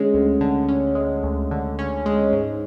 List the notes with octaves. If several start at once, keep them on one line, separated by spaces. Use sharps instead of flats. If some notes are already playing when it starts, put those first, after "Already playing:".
Already playing: D3 G#3 C#4
D2
D3
C#4
G#3
D2
D3
C#4
G#3
G#2